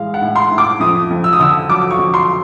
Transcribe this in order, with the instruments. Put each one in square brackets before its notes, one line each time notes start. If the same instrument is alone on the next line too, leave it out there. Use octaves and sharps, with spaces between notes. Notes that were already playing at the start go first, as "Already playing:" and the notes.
Already playing: [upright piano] A2 E3 G#3 F5
F#5
A2
C6
A2
D6
F2 D#6
F2
E6
D#6
D3 E6
F#3 D6
C#6
F2
C6